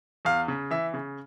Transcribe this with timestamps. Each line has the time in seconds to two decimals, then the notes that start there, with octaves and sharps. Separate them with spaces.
0.25 E2 F5
0.48 C#3
0.71 E3 E5
0.94 C#3